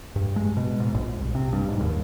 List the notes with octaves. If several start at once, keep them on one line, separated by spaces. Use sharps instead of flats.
G2
G#3
B2
G#2
A#1
C2
C3
G2
G#2
D#2